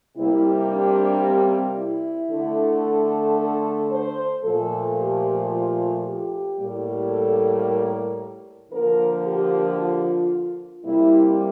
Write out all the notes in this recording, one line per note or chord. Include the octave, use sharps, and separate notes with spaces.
C3 G3 A#3 E4
D4
C4
E4
D3 A3
A4
C5
A#2 F3 A3 A4
G4
F4
G4
A2 G3 A#3
A4
A#4
D3 F3 A#3 A#4
G4
F4
C3 G3 A#3 E4